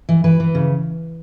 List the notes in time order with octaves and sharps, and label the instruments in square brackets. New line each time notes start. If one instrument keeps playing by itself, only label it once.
[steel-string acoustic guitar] E3
E3 B4
E3
C#3